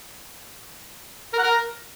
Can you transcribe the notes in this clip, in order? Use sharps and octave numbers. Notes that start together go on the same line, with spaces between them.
A#4
F#5
A#4